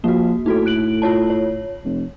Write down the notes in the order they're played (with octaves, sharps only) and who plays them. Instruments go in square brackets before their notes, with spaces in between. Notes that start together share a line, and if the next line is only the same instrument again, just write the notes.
[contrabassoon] F3 [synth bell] A#3 F#4
[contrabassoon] A2 [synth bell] D#4 F#4 A4
[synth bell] F#6 D7 F#7
F4 C#5 A5
C#5
[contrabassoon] F1